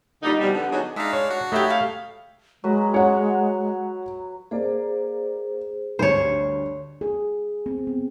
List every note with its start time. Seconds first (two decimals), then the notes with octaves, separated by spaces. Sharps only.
0.22 A#2 D3 G3 D#4
0.40 B2 E3 F3 G3
0.53 D3 B3
0.71 F#3 B3 D4 D#4 G#4 C#5
0.96 G#3 D4 D#4 E5 F5
1.13 D4 C#5
1.31 F#4
1.52 A3 D#4 G4 C#5 E5 B5
1.70 F5
2.64 F#3 G#3 B4 A#5
2.94 C#5 F#5
4.51 A#3 G#4 C5 D5
5.99 D2 G2 C5 C#5
7.01 G#4
7.66 C4
7.87 B3